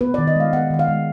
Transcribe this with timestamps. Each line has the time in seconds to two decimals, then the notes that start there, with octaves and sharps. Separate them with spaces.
0.01 B3 B4
0.14 D5
0.18 D#3
0.27 D#5
0.36 G#3 F5
0.53 B3 F#5
0.71 D#3 F#5
0.79 F5
0.88 G#3